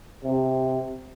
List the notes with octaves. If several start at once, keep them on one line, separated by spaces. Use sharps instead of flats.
C3